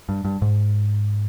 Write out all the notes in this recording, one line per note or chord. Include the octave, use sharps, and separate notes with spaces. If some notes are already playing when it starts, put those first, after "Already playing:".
G2
G2
G#2